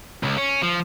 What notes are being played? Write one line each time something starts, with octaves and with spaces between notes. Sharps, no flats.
C#2
C#4
F3